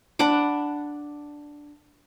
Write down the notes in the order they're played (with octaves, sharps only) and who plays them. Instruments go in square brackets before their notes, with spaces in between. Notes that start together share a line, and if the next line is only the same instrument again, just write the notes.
[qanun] D4 F#5 B5 D6